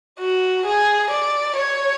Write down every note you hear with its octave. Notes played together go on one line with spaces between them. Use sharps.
F#4
G#4
D5
C#5